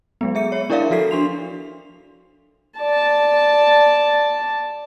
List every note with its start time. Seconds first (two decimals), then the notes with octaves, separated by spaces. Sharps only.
0.21 F#3 G#3 B3
0.35 G#4 E5 C#7
0.52 C#5
0.70 D4 E4 A#4 D5 E5 F5
0.90 F3 F#4 A4 B6 C7
1.11 D4 C6 F7
2.80 D5 A5